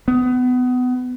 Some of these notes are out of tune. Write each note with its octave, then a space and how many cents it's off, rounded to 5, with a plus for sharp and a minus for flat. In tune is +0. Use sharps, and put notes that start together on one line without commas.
B3 +25